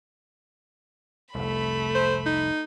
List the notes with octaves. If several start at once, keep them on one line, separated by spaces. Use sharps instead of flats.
F1 C2 A3 B5
C5
D#4